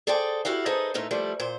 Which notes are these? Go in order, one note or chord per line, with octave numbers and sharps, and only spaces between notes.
G#4 A4 C5 D5 G5
E4 F#4 G4 F5
D#4 G#4 A4 B4 C5 D#5
A2 A3 D#4 F4
F3 G3 A3 E4
A#2 C5